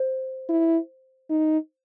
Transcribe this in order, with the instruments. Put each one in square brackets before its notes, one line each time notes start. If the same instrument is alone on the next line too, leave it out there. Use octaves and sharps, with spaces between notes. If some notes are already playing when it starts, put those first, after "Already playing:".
Already playing: [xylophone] C5
[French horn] E4
D#4